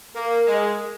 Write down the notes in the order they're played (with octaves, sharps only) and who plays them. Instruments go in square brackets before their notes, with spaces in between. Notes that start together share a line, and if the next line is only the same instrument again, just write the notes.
[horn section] A#3 [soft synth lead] A#4
[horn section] G#3